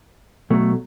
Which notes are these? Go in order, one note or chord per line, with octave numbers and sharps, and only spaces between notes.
B2 F#3 A3